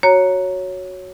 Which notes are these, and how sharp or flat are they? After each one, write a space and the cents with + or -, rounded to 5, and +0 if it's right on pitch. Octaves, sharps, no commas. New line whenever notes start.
F#4 +0 C#5 +0 A#5 +0